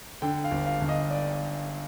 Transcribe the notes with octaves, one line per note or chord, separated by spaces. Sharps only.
D3 G5
F5
G1
F5
G1
D#5
D5